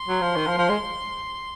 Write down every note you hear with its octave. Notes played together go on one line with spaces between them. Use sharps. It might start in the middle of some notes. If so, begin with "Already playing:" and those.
Already playing: C6
F#3
F3
D#3
F3
F3
G#3